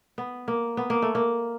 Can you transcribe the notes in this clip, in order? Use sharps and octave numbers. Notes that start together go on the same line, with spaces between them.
B3
A#3
B3
A#3
A3
A#3